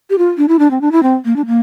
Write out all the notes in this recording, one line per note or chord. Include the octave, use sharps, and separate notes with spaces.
G4
F4
D4
E4
D4
C4
D4
E4
C4
A#3
D4
A#3